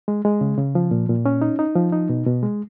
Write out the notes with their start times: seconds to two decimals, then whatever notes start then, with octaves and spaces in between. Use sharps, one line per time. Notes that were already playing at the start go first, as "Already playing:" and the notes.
0.08 G#3
0.25 G#3
0.41 C#3
0.57 C#3
0.75 F3
0.91 A#2
1.09 A#2
1.26 C#4
1.41 D#4
1.59 D#4
1.75 F3
1.92 D#4
2.09 B2
2.27 B2
2.43 G#3